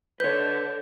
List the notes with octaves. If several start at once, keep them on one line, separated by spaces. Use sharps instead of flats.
D3 B4 C#5 G6